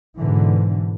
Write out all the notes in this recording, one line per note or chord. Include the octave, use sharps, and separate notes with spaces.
G#2 B2 D3 E3